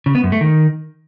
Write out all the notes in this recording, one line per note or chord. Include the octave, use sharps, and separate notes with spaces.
C#3
B3
F#2
A3
D#3